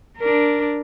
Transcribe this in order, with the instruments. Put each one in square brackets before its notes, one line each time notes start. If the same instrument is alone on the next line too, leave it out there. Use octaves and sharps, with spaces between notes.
[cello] D4 A#4